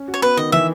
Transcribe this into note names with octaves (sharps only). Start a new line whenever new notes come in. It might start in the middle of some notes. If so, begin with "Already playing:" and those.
Already playing: C#4
F#4
C#5
B3 B4
D#3 D#5
E3 E5